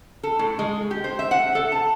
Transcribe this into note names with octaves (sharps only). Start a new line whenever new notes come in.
A4
A2
G#3
G4
C5
E5
F#5
A4
A5